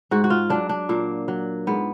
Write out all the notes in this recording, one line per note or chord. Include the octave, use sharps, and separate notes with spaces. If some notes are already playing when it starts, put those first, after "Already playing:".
G#2 F#4
F#4
F4
F#3 D4
D4
A#2 A#3
F#3
G#2 B3